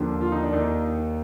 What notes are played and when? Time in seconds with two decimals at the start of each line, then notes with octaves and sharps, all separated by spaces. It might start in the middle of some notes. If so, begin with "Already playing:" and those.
Already playing: D#2 D3 F3
0.21 F4
0.32 D#4
0.43 D4
0.52 D#2 D#3 D#4